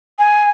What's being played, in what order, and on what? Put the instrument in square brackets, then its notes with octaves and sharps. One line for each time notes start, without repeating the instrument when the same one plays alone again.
[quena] G#5